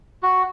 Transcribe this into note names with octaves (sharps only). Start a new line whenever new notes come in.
F#4